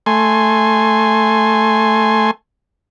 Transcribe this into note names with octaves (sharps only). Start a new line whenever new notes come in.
A3 G#5 C6